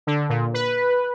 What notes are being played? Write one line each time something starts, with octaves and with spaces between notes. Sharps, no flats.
D3
A#2
B4